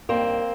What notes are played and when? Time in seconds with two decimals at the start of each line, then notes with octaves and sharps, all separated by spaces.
0.09 G2 D#3 A#3 C4